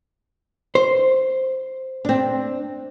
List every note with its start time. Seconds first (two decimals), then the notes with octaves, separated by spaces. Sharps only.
0.75 C5
2.05 C4 D4